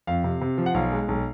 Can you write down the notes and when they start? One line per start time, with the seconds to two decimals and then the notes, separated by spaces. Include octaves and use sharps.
0.07 F2 F5
0.24 C3
0.41 C3
0.58 F3
0.66 F#5
0.74 B1 F5
0.92 G#3
1.08 B1